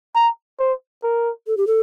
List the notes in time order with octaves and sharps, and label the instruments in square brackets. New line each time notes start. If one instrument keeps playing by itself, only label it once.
[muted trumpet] A#5
C5
A#4
[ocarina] A4
G4
A4